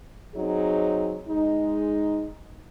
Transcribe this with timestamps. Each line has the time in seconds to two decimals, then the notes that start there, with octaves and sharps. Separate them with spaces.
0.35 F#3 C4 D#4 G#4
1.29 G#3 D#4